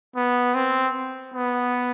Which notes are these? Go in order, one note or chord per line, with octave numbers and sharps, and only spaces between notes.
B3
C4
B3